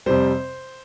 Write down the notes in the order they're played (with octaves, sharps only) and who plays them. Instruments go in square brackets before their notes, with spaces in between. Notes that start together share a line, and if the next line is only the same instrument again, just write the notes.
[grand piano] F2 C3 G3 C5